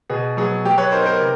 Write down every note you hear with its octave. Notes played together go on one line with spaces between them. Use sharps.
B2 G#4
F#3 B3 G#4
F#3 G4
B4 C#5
B3 D#4 A#4 C5
A#4 C5
C3